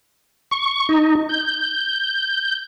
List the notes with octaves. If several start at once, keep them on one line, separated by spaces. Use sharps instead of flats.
C#6
D#4
G6